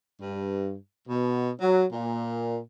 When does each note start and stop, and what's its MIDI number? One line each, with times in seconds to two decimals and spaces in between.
0.20 0.75 43
1.08 1.50 47
1.60 1.84 54
1.92 2.58 46